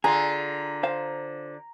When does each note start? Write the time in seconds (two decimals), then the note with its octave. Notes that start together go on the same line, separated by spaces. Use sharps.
0.04 D3 F4 G#4 A#5
0.83 C5 F5